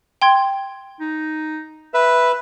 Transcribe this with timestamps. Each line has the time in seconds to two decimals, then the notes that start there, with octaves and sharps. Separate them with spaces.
0.22 G5 C6 G#6
1.00 D#4
1.94 B4 E5